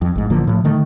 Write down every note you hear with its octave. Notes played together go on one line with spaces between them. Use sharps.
F2
G#1 G#2
A1 D3 F3 A#3
A2 F3
D3 D#3 A3